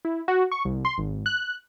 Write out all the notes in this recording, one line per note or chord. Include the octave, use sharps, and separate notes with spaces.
E4
F#4
C#6
C2
C6
G#1
F#6